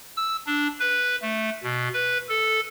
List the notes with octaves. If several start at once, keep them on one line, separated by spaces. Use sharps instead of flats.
E6
D4
B4
A3
B2
B4
A4